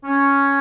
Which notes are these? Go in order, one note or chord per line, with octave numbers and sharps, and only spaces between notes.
C#4